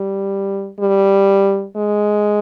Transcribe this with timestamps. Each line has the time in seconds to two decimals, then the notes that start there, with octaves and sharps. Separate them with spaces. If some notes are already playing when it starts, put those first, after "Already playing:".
Already playing: G3
0.80 G3
1.76 G#3